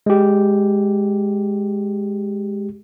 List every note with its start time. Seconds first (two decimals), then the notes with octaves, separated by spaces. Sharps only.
0.06 G#3 G4